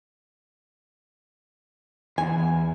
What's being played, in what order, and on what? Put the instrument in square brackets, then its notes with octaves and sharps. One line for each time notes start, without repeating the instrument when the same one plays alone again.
[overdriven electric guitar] E2 [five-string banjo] G#5